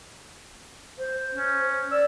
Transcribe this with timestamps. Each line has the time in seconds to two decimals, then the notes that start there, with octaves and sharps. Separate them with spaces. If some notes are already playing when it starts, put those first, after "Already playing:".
0.98 C5
1.34 C#4
1.91 D5 E6